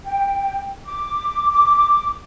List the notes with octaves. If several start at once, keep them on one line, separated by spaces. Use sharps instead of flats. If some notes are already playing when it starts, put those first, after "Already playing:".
G5
D6
D6